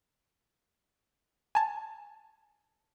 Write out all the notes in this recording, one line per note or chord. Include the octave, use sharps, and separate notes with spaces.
G#5 A5